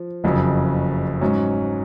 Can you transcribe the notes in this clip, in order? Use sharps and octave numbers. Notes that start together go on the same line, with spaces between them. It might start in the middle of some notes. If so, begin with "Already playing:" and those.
Already playing: F3
F#1 F2 C#3 F#3
G#2 F#3 C#4